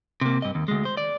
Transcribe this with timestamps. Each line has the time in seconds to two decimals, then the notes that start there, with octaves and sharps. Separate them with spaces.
0.21 C3 A#3
0.42 G2 D#5
0.55 D#2
0.68 D2 G#3
0.85 C5
0.97 D5